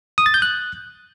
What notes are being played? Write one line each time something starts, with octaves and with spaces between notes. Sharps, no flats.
D#6
A6
G6
F#6